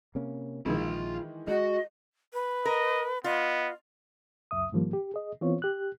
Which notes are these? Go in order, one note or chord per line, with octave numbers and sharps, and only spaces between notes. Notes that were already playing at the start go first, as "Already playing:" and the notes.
C3 A#3 C#4
A#1 D#3 E3 G#3 F4 B5
G#3 F#4 D#5
B4
A#4 D#5
B3 F4 D#5
C#2 F#2 E5 D#6
G#2 D#3 F3 G3 A#3
G4
G#4 D#5
E3 B3 C4 F4 C#5
G4 F#6